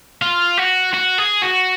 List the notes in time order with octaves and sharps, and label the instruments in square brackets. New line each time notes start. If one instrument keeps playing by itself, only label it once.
[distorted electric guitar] F4
F#4
F#4
G#4
F#4